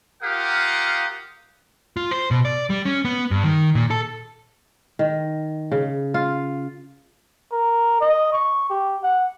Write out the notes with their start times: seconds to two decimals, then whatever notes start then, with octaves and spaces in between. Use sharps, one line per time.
0.23 F4 G4 A#4 F5 F#5 D#6
1.97 F4
2.11 C5
2.31 B2
2.45 D5
2.70 G3
2.85 C#4
3.05 B3
3.31 G2
3.43 D#3
3.75 A#2
3.91 A4
4.99 D#3
5.72 C#3
6.14 F4
7.52 A#4
8.01 D#5
8.33 C#6
8.70 G4
9.03 F#5